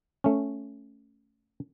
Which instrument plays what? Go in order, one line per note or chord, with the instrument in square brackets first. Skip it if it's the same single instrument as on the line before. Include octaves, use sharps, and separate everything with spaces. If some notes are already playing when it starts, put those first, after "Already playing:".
[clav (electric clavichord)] A3 C#4